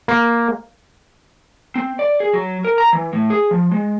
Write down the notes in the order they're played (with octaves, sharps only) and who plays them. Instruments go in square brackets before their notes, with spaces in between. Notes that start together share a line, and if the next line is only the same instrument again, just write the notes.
[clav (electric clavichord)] A#3
[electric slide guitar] C4
D5
G#4
F#3
A#4
A#5
E3
A2
G#4
F3
G#3